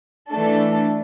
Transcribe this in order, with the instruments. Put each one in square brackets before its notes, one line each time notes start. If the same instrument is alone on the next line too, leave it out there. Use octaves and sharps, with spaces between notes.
[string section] E3 A3 D4 A4